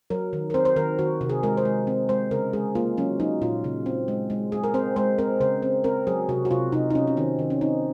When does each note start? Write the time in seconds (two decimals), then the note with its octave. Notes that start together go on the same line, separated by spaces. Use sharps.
0.10 F#3 A#4
0.33 D#3
0.50 A#4
0.54 C4 C5
0.65 C5
0.76 D#3 A#4
0.99 D#3 F#4
1.21 C3
1.30 G#4
1.43 G#3 A#4
1.57 C5
1.65 G#3
1.87 C4
2.09 G#3 C5
2.31 C#3 A#4
2.53 G#3 G#4
2.75 A#3 F4
2.97 F#3 C#4
3.20 F#3 D#4
3.41 A#2 F4
3.64 C#3
3.86 C4
4.08 G#3
4.30 G#3
4.52 G#3 G#4
4.64 A#4
4.74 C4 C5
4.96 G#3 C5
5.18 C4 A#4
5.41 C#3 C5
5.62 C4
5.84 C4 A#4
6.07 F#3 G#4
6.29 C3 F#4
6.45 F#4
6.51 C3 F4
6.72 C3 D#4
6.90 D#4
6.95 C3 C#4
7.07 C#4
7.17 D#3 C4
7.39 D#3
7.50 C#4
7.61 C4 D#4